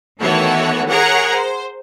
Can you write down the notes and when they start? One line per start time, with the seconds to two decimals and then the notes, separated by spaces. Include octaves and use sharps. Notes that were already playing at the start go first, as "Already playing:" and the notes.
0.19 D#3 E3 A3 B3 F#4 C#5
0.89 G#4 A#4 C#5 F#5 A#5
1.34 C5